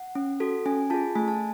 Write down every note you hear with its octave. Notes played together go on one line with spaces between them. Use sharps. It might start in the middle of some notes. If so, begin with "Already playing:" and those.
Already playing: F#5
C#4
F#4 A4
C#4 G#5
F4 G#4 A5
A3 G#5
A5